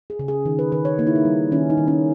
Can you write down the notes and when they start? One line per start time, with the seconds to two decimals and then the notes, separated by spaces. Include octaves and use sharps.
0.10 G#4
0.19 C#3
0.28 G#4
0.45 D#3
0.59 B4
0.72 D#3 B4
0.85 C#5
0.99 A#3 D#4
1.07 E4
1.16 D#4
1.25 G3
1.52 D#3 C#4
1.70 D#4
1.77 D#3
1.88 C#4